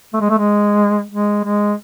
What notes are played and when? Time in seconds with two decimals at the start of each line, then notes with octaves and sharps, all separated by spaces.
0.14 A3
0.21 G#3
0.29 A3
0.38 G#3
1.12 G#3
1.44 G#3